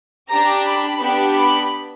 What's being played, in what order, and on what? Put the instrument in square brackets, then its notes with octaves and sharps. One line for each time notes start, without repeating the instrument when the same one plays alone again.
[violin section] D4 G4 A#5
B5
B3 D4 G4
B5